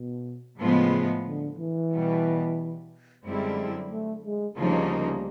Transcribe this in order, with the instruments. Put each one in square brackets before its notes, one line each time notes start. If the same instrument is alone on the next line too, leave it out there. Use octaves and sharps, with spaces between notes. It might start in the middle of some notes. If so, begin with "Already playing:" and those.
Already playing: [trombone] B2
[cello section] A2 F3 G#3 B3 [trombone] C#3
[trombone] D3
E3
[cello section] B2 G3 B3
[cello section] F#2 D3 G3 C4 E4 [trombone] G#3
[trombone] A3
G#3
[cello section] D2 C#3 F3 A#3 D#4 [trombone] G3